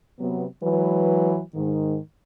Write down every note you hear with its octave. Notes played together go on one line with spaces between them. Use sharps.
C3 F#3 B3
E3 F#3 G#3 B4
G#2 D#3